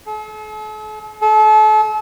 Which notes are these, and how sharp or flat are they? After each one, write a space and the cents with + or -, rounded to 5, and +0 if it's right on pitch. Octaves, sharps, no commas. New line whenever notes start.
A4 -45
A4 -35